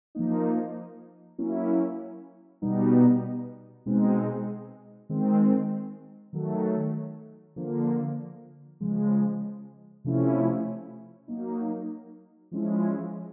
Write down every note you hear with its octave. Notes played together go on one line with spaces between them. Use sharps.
F3 A#3 D#4
F#3 A#3 C#4 E4
B2 G3 B3 D#4
B2 G#3 C4 D#4
D#3 G#3 C4
D#3 F#3 A3
D3 F3 A#3
C#3 F3 G#3
C3 F3 A3 C#4 E4
F#3 A#3 D#4
F3 G#3 C#4 E4